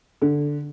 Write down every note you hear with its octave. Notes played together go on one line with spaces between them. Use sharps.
D3